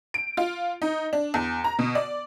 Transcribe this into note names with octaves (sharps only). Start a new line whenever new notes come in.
D7
F4
D#4
D4
E2
A#5
B2
D5